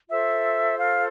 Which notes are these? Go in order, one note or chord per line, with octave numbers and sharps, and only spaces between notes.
F4 A4 C5 E5 E6
F5 F6